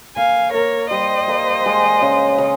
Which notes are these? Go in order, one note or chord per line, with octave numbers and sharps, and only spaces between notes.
A#3 F5 G#5
A#3 A#4 C#5
G3 C5 D#5
A#3
G#3
C#3
C#3